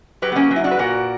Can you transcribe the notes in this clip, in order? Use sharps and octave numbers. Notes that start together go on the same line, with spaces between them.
F#3 G4 B4
B3
A#3 C#4
F#3
E4
D4 F#4
B4
A#2 F#4 A#4